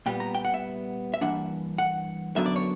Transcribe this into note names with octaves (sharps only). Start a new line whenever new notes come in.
A#2 G3 B3 G5
A#5
G5
F#5
E5
E5
G2 E3 A#3 D4 F#5
F#5
F#2 D3 F#3 B3 D4 E5
D5
C#5